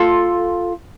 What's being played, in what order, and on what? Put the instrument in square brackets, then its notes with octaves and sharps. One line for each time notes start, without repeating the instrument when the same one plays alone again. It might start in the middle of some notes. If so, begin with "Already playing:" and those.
Already playing: [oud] F4 A4